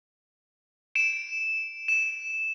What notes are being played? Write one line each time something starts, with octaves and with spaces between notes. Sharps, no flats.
D7 E7
E7